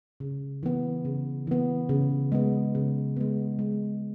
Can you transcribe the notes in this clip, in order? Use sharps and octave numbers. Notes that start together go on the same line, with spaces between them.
C#3
E3 B3
C#3
E3 B3
C#3
G#3 B3
C#3
G#3 B3
G#3